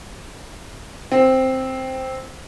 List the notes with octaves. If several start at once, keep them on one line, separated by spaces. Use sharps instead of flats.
C4